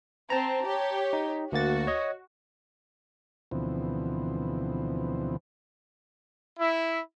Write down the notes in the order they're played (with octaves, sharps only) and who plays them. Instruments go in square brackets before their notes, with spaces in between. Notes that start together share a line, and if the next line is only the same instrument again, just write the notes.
[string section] C4 [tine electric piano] A5 A#5
[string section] G4 C#5
[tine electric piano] D#4
[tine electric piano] D2 A#3 A6 [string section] F#4
[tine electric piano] C#5 D#5
[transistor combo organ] D2 B2 E3 F3 C4
[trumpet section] E4